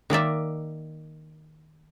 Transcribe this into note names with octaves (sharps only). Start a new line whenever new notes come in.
D#3 A#3 D5 E5